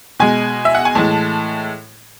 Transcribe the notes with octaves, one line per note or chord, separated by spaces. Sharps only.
B2 G#3 G#5
E5
F#5
G#5
A2 E3 G#3 A5